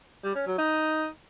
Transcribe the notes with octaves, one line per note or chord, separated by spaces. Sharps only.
G3
C#4
F#3
D#4